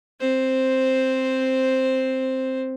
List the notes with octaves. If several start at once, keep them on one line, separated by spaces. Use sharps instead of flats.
C4 C5